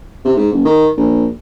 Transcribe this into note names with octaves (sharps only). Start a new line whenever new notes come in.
C3
G#2
F#1
D#3
A#1